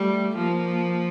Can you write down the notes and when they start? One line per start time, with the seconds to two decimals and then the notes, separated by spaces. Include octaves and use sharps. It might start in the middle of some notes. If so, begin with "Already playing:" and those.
Already playing: G3 A3
0.36 F3 A#3